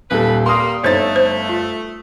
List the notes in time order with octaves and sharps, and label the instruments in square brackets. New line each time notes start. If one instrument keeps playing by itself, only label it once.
[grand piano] D#1 A4 [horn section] B4
[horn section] G3 A#3 [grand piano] C6 D#6
[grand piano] G1 D#4 A6 [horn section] A3 [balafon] C5 C#5
[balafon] C5
F4